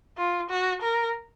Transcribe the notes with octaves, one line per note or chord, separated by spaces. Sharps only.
F4
F#4
A#4